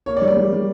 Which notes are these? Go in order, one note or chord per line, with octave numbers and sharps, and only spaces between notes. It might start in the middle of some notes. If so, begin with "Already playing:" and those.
A#3 C#5
D5
G3
D5
G3
G3